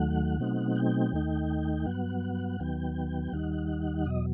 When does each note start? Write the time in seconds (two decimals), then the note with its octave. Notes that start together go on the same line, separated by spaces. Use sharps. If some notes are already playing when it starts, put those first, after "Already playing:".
Already playing: D#2 D#3 F#3 A3 F#5
0.40 B2 F#3 A3 C4 D#4
0.76 G5
1.13 D#2 D#3 A3 D#4
1.86 G2 F#3 B3 F#5
2.59 D#2 D#3 F#3 B3 G5
3.32 D#2 D#3 G3 D#4 F#5
4.05 E2 B2 F#3 D#5